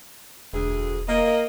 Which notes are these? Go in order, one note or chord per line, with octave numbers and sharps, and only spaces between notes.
E1 D2 G#4
A#3 D#5